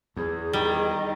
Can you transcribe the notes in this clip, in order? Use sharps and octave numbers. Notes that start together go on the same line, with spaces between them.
E2 G#4
D#3 G3